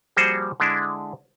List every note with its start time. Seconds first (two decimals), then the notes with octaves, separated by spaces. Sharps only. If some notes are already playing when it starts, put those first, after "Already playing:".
0.17 F3 G3 A#3 F#4 G#4 C5
0.60 D3 G#3 D4 E4